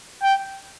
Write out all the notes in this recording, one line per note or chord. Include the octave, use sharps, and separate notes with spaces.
G5